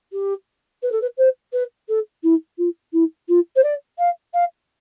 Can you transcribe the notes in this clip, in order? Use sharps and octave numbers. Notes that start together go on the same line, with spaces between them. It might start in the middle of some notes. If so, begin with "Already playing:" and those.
G4
B4
A4
B4
C5
B4
A4
E4
F4
E4
F4
C5
D5
F5
F5